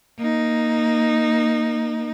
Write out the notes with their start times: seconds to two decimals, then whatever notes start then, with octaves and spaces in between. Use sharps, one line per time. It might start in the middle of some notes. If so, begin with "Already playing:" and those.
0.18 A#3 D#4